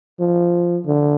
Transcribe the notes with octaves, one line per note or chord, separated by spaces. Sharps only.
F3
D3